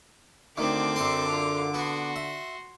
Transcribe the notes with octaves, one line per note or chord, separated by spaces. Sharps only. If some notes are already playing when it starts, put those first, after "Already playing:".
D2 D3 D#3 C4 D5 D6
F#2 A4 C6
F4
B3 F#4 C6
E5